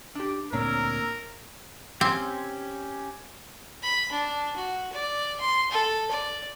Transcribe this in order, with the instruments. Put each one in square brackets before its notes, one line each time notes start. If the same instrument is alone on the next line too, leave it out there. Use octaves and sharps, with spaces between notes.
[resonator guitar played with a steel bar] D4 G4
[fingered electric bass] D2 A#2 C4 [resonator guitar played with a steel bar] D4 C#5 [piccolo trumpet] A#4 [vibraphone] A#5 E6
[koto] C4 [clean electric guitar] C#4 G4
[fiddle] B5
D4
F#4
D5
C6
A4
D5